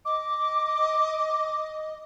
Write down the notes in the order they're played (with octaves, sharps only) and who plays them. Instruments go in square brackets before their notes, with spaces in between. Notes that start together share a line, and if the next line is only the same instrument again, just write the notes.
[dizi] D#5 [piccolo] D6